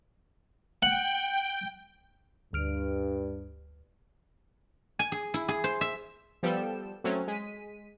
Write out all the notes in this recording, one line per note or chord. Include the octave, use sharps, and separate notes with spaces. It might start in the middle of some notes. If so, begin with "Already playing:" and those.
F#5 G5
D2 G2 F6 D7
G#5
G#4
E4
G#4
C5
E5
F3 G3 B3 A4 G5 E7
F#3 A3 C4 C#4
G#3 B6 D#7